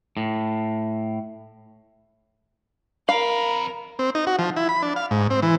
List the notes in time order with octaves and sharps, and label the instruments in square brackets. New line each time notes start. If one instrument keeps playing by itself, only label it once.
[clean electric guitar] A2
[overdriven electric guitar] F2 B5 [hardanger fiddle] A#4 [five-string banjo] F5
[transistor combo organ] C4
D#4
F#4
F3
E4
B5
D4
F5
G#2
C4
E3